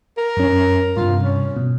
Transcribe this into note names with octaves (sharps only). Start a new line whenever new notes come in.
A#4
F#2 C#4
G2 C3 F4
C#4
B2